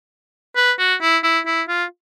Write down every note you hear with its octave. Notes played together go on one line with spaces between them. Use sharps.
B4
F#4
E4
E4
E4
F4